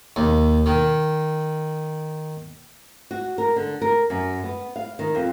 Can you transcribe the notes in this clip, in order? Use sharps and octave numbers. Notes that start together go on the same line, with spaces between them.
D#2
D#3
F#4
A#4
D3
A#4
F#2
B3
F5
D#3
F2